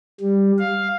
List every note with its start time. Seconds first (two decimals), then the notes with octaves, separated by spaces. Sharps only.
0.20 G3
0.59 F5